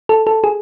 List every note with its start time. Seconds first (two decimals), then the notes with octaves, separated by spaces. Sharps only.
0.09 A4
0.27 A4
0.44 G#4